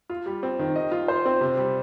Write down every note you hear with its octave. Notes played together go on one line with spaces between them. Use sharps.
F4
G3
C4
D#3
D#5
F4
C5
C4
C3
G3